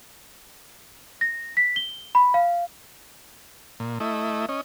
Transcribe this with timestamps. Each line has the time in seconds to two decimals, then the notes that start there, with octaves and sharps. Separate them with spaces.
1.21 A#6
1.57 B6
1.76 G7
2.15 B5
2.34 F5
3.80 A#2
4.00 A3 E4 D#5
4.49 C#4 D#5